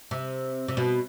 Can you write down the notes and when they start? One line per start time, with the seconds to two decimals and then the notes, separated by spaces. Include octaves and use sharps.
0.11 C3
0.68 C3
0.77 B2